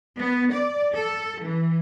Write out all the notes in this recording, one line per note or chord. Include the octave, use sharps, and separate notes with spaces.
B3
D5
A4
E3